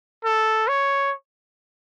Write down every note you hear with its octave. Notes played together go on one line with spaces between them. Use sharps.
A4
C#5